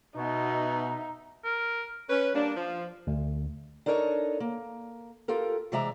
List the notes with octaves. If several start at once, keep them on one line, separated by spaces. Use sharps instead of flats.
B2 D#4 E5
A#4
C#4 B4
G3 A#3 D4
F3
D2
D4 D#4 A4 A#4 C#5 D#5
A#3
F4 G4 A4 A#4
C3 E3 G#3 D5 E5 A#5